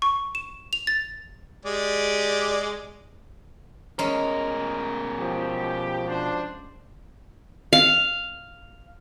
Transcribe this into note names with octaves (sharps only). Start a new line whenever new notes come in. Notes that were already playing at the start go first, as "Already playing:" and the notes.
C#6
E7
F7
A6
G#3 G4 D5
B2 G#3 C#4 A#4
F3 G4
D4 C5
F5